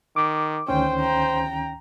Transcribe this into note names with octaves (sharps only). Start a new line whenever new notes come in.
D#3 D6
D2 D#3 C#4 C5 G5
G5 A#5